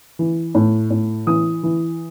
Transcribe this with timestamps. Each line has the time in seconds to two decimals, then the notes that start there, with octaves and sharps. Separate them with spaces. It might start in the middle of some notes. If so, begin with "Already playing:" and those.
0.19 E3
0.55 A2
0.90 A2
1.27 E3 D#6
1.63 E3